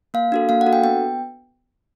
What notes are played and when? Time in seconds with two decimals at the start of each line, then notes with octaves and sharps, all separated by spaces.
0.14 A#3 F5
0.32 D4 F#4 A4
0.49 A#3 F5
0.61 F#5
0.66 D4 F#4 A4
0.73 G5
0.83 B3 G5